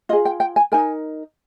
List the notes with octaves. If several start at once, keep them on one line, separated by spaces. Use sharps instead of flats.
F4 G#4 D#5
G5
G5
G#5
D#4 A#4 G#5